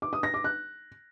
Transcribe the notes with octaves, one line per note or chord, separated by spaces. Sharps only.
D6
D#6
A#6
D6
F#6